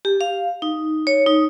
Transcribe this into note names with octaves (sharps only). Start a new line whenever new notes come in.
G4
F5
D#4
C#5
D#4